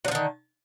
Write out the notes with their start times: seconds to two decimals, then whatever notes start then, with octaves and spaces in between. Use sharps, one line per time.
0.05 F#3
0.08 F3
0.11 D3
0.15 D#3